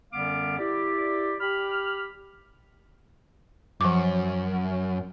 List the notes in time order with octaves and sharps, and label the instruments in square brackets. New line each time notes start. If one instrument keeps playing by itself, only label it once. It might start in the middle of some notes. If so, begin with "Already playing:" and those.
[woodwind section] F#2 D3 G3 B3 F5 D6
E4 G4 D5
G4 B5 F6
[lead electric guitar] F#2 [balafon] F3 D6